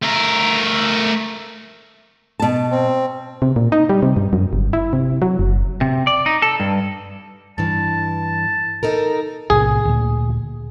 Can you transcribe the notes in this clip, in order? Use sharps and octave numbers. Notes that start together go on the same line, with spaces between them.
A3 A#4
B2 A5
C4
C3
A#2
D#4
G3
C3
G2
F#2
G1
E4
C3
F#3
F#1
C3
D5
D#4
A4
G2
G2 E3 A5
D#4 A4 A#4
B1 A2 C3 G#4
D2 A#2